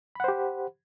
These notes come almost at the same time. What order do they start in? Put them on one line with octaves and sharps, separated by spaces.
B5 F#5 C5 G4